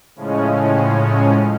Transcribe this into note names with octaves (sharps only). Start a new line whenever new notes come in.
A2 C#3 F3 G#3 C#4